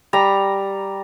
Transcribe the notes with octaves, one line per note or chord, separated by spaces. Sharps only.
G3 A#5